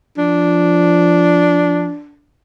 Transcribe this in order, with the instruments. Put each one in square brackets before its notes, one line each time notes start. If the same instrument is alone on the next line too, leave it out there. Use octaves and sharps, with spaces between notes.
[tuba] F3 [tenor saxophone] D4